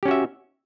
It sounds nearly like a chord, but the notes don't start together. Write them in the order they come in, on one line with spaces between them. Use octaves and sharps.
G4 C#4 F#4 E5